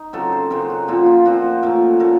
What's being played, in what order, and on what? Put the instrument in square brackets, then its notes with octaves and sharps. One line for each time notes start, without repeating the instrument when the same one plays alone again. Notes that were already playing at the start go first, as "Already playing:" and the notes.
Already playing: [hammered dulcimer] D#4
C#3 F#3 C4 A4
C5
C#3 F#3 C4 A#4
F#4
A#2 F3 C4 F4
F4
A#2 F3 C4 F#4
A#2 A3 C#4 A#4
A#2 A3 C#4 A#4